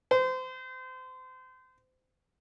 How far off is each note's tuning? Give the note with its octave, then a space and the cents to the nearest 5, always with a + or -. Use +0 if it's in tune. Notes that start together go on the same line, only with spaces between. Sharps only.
C5 -30